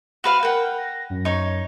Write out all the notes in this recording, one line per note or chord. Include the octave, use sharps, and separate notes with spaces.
F#4 B4 F5
A#4 F#5 G5
A#6
F#2
D#4 C#5